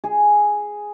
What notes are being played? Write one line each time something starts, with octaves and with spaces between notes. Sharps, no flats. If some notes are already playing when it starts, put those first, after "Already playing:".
G#4